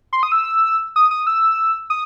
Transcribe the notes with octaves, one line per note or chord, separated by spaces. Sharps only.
C6
D#6
E6
D#6
D#6
E6
D#6